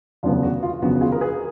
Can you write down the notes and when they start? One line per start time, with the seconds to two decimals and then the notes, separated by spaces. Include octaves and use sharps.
0.23 F1 D#2 C#3 F#3 B3 F4
0.43 F#4
0.63 F4
0.81 F1 D#2 C#3 F#3 B3 F#4
1.01 F4 G#4
1.12 A#4
1.21 G#4 B4